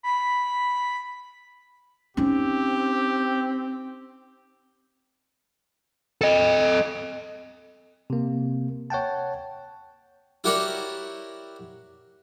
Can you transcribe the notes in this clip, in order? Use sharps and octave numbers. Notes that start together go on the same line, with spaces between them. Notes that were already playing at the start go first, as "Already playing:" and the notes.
B5
C4 C#4 D#4 G4
A4 D#5
C3 A#3
C#5 F#5 G5 A5
E4 F#4 G4 A#4 C#5 D5